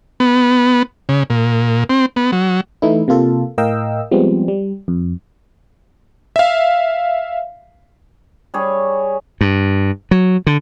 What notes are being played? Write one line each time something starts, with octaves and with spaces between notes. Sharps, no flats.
B3
C#3
A#2
C4
B3
F#3
E3 A3 D#4 E4
C3 A#3 F4 A4
A2 A#4 D#5 F5 G5 E6
F3 G3 G#3 B3 C4
G3
F2
E5 F5
G3 G#4 C#5
G2
F#3
D3